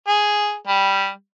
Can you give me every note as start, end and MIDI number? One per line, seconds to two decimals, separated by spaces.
0.08 0.54 68
0.68 1.09 55